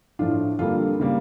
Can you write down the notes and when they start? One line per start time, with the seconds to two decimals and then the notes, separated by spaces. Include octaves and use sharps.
0.19 A2 F3 A3 D4 F4
0.59 F2 D3 G3 A#3 F4 A4
1.00 C#3 G3 A#3